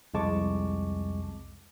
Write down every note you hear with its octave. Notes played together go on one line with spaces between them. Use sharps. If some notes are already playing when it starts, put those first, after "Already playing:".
C2 F2 G#3 A5 C#6 D6